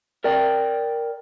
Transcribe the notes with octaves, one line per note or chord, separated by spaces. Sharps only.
A#4 D5 G5